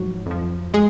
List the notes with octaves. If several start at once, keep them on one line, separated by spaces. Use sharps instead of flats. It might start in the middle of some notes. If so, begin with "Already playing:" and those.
Already playing: G#2 F3 F#3 F#4
F2 F3
G#3 G#4